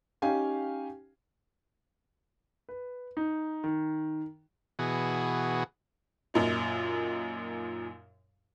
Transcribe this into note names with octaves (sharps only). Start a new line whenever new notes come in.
C#4 D#4 G4 F5 G5 G#5
B4
D#4
D#3
B2 E3 F#4 G#4
F#2 A#2 D#4